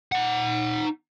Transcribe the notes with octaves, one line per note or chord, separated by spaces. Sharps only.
D#4 F#5